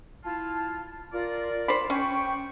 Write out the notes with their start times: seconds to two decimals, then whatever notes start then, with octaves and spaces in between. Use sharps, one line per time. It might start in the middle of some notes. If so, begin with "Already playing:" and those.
0.24 E4 F4 A5
1.12 F4 A#4 D5
1.68 C5 B5 D6
1.90 C#4 G5 C#6